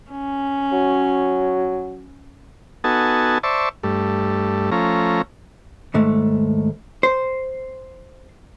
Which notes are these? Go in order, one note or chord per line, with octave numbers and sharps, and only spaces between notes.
C#4
F#3
B3 D#4 F#4 A4 G#5 A5
C5 D5 E5 A5 C#6
G2 A3
F3 A3 C#4 A#5
D#2 G#2 A3
C5